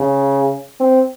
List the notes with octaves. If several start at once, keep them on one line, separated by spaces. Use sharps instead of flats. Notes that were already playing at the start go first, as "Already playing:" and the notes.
Already playing: C#3
C4